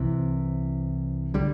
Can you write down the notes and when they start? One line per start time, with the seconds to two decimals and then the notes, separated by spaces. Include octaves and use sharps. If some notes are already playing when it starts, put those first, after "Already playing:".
Already playing: C2 C3 E3
1.34 D3 G3